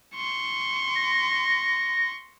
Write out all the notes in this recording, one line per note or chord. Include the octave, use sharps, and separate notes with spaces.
C6 C#6
A#6